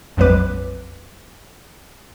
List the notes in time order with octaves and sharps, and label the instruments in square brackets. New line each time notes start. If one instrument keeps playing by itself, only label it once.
[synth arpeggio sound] A#1 F2 F#3 G#3 B4 D6